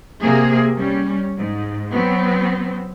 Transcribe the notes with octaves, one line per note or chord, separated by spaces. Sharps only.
C3 A#3 G#4
G3 C#4
G#2
F#3 B3 C4